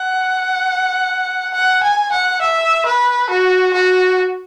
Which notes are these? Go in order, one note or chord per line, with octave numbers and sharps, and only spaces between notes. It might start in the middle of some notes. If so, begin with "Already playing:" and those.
Already playing: F#5
F#5
G#5
F#5
E5
B4
F#4
F#4